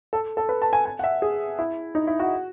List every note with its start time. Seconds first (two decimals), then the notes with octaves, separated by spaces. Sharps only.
0.13 A4
0.37 A4
0.49 B4
0.62 A5
0.73 G#5
0.85 G#5
0.99 F#5
1.04 E5
1.22 G#4
1.59 E4
1.95 D#4
2.07 E4
2.19 F#4